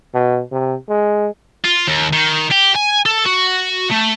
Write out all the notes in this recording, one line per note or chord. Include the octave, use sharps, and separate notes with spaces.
B2
C3
G#3
F4
D#2
D#3
G4
G#5
A4
F#4
A3